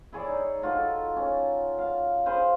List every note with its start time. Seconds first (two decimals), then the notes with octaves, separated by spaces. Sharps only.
0.13 E4 G#4 C#5 D5
0.27 D#4
0.62 D#4 F4 F#4 A4
1.16 C#4
1.79 F5
2.26 G#4 B4 C5 F5